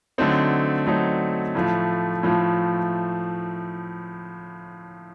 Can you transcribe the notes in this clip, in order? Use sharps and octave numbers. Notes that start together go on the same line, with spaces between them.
D3 F#3 A3 C4 D#4
D3 F#3 A3 C4 D#4
A2 F3 A3
A2 F3 A3